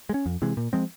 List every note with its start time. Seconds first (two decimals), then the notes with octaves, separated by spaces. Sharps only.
0.09 G#3
0.14 C#4
0.26 F2
0.42 C3 E3 G#3
0.57 A#2
0.73 F3 G#3 C4